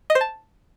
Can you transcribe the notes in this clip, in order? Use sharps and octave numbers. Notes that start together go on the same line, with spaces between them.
D#5
C5
A5